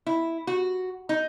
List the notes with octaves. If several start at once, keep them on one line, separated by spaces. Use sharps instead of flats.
E4
F#4
D#4